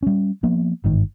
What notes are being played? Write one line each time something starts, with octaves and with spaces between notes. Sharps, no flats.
G3 C#4
F3 A#3 B3
G1 G#2 D#3